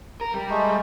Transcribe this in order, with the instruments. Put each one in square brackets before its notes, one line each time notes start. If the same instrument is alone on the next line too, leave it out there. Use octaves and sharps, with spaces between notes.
[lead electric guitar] A#4
G3
[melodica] G#3 A3